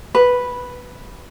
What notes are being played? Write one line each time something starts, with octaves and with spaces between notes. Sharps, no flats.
B4